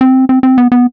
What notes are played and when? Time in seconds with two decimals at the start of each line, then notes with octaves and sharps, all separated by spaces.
0.01 C4
0.29 C4
0.43 C4
0.58 B3
0.72 B3